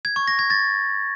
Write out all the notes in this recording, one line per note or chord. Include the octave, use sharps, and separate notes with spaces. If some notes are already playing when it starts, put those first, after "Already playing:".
G#6
C#6
A#6
G#6
A6